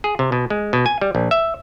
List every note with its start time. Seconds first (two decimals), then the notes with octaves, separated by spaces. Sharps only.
0.04 G#4
0.19 C3
0.32 B2
0.50 G#3
0.73 B2
0.86 G#5
1.01 G3
1.15 A#1
1.31 E5